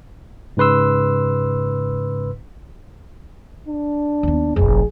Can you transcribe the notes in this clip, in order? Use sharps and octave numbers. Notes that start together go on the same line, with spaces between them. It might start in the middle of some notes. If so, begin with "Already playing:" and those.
G#2 C#3 B4 C6 E6
D4
D#2 B3
F1 A#1 G#4